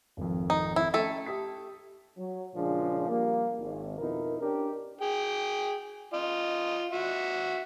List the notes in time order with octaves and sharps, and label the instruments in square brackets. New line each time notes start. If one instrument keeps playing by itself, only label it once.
[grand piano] G#1 F2
[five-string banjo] D#4
E4
[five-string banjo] A3 A4 [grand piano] C#4 G5 D#7
[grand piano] G4 D#6 B6
[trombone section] F#3
A#2 C#3 F3 G#3 D4
F3 G3 A#3
G#1
F2 B2 D#4 E4 A#4
C#4 D4 G4 A#4
[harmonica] G#4 G5
F4 D#5
F#4 E5